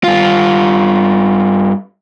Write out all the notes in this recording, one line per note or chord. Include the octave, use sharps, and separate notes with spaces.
G2 F4